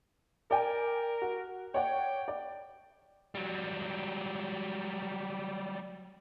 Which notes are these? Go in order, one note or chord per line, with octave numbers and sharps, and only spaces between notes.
A#4 D5 G5 G#5
F#4
C#5 D5 F#5 G5
D5
F#3 G3